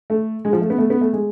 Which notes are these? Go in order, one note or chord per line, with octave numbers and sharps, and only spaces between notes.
A3
G#3
F3
A3
B3
A3
B3
A3
G#3